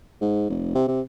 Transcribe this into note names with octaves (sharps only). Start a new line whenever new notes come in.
G#2
F1
C3
C3